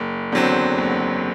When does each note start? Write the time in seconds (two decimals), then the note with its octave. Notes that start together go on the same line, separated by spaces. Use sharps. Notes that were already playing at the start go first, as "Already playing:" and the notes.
Already playing: F#1
0.32 E2 D3 F#3 C4
0.78 F#1